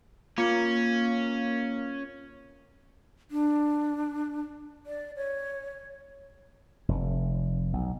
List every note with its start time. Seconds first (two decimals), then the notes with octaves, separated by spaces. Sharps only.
0.38 A#3 C#4 F4 C#7
3.31 D4
4.86 D5
5.16 C#5
6.88 F1
7.73 B1